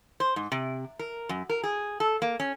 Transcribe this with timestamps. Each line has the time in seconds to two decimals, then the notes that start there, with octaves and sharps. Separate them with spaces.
0.20 C5
0.36 G#2
0.52 C3
0.99 A#4
1.29 F#2
1.49 A#4
1.63 G#4
2.00 A4
2.22 A#3
2.40 C#4